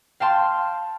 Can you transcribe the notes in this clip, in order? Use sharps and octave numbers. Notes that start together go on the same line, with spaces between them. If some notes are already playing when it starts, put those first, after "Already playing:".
F5 G5 A5 C6